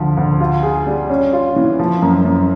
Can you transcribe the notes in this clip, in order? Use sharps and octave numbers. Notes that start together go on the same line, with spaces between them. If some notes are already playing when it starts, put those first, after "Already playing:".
Already playing: D2 F3
D2
F4
G#4
G3
C#4
F4
E3
F3
F#2
F#2